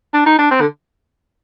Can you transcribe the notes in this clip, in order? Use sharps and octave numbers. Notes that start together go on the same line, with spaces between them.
D4
D#4
D4
C4
D3